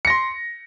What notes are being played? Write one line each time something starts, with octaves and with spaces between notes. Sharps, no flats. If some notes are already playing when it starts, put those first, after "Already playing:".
C6 A#6 C#7